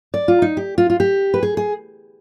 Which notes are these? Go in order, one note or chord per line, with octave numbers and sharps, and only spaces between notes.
D5
F4
D#4
G4
F4
F4
G4
B4
G#4
G#4